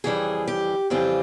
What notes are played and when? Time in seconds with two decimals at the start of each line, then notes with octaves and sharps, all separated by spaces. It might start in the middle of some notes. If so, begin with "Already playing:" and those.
0.04 F2 C#3 E3 G3 C4 G#4
0.48 G4
0.90 F2 C#3 E3 G3 C4 F4